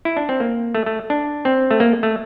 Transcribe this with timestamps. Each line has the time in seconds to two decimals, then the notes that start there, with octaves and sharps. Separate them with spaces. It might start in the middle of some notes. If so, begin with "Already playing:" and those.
0.05 E4
0.17 D4
0.29 C4
0.40 A#3
0.75 A3
0.86 A3
1.10 D4
1.45 C4
1.71 A3
1.80 A#3
2.03 A3